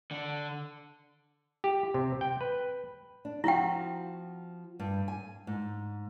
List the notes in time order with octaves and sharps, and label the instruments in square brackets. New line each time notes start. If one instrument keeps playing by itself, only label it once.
[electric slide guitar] D3
[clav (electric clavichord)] G4
C3
G5
B4
[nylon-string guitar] D4
[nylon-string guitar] F3 C4 F#4 [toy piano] E4 G5
[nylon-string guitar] G2
G#5
G#2